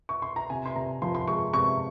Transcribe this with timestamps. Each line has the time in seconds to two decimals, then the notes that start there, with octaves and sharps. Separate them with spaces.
0.09 C#6
0.22 C6
0.36 A#5
0.50 C3 G#5
0.65 C6
0.75 C3 A#5
1.02 F3 C6
1.15 C6
1.28 G#3 C#6
1.53 C3 C#6